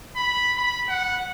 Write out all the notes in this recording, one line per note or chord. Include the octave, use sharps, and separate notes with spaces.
B5
B5
F#5